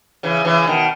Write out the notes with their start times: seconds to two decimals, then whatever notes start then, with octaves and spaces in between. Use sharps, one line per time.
0.23 C#3 E3
0.45 C#3 E3
0.67 B2 D#3